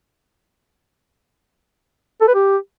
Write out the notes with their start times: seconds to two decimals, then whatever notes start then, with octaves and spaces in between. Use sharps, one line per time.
2.21 A4
2.28 B4
2.35 G4